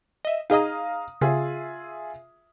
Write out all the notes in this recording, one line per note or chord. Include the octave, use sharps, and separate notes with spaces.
D#5 E5
D#4 G#4 D#5 F5 A#5 D#6
C#3 F4 G#4 E5